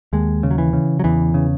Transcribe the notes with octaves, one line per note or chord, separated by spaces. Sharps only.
D#2 G#3
C#3
F#3
E3
C#3
F#3
E2 E3
C#3